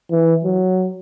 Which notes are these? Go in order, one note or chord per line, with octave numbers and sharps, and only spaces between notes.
E3
F#3